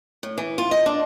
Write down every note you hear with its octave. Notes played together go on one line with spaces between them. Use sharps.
A2
E3
F4
D#5
D4